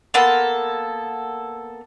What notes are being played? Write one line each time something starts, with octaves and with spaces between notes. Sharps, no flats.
A#3 B3 A4 C6